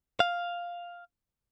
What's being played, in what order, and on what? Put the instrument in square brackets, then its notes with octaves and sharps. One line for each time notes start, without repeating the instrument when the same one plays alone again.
[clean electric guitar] F5